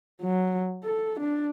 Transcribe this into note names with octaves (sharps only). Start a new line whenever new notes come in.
F#3
A4
D4